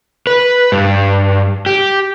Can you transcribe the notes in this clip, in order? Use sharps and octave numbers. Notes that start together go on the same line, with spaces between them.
B4
G2
G4